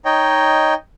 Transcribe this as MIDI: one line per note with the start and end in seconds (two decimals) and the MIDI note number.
0.05 0.74 63
0.05 0.74 73
0.05 0.74 75
0.05 0.74 79